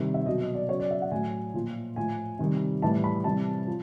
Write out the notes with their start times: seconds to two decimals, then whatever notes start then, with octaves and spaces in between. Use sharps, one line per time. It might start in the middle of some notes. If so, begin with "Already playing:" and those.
Already playing: C3 D#3 G3
0.14 E5
0.26 B2 F#3 D#5
0.41 D#5
0.54 D5
0.69 C#3 F#3 C#5
0.80 D5
0.91 E5
1.02 F#5
1.11 A2 F#3 G#5
1.54 A#2 F3
1.96 A2 F3 G#5
2.39 C3 D#3 G3
2.82 A2 E3 G3 A5
3.04 B5
3.24 C3 E3 G3 A5
3.67 F3